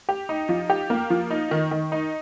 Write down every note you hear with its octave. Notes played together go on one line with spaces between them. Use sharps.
G4
D#4
F3
G4
A#3
F3
D#4
D#3
D#3
D#4